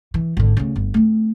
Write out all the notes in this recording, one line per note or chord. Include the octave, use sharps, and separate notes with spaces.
E3
G#1 D3
D2 C#3
G1
A3 C4